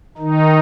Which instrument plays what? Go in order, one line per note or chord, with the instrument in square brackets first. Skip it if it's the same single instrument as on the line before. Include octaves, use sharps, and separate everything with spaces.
[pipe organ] D#3 D#4